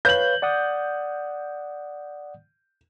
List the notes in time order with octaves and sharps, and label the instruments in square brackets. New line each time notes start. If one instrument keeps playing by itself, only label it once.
[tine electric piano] B4 C#5 F5 [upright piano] G6 F#7
[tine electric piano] D5 F#5 D#6